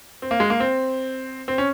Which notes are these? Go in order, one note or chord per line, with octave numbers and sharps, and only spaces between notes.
C4
A#3
G#3
A#3
C4
C4
C#4